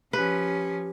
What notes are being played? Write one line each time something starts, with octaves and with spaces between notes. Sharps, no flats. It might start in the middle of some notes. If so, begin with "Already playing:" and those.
F3 C#4 G4 B4